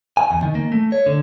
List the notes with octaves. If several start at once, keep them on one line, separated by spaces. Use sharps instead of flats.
G#5
E2
D#3
A#3
A3
C#5
D3